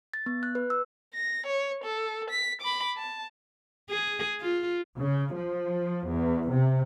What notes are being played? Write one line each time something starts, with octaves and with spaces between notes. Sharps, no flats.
A6
B3
F#6
B4
E6
A#6
C#5
A4
B6
B5 D6
A5
G#4
F4
C#3
F3
E2
C3